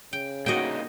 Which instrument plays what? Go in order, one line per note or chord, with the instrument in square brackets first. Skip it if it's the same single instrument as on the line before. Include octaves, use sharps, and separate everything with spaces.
[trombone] C#3 [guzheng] G5
[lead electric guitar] C2 D#4 [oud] A#3 F#4 [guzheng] D#5 G5